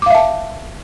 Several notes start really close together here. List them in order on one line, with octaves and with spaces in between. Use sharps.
D6 F5 E5 A5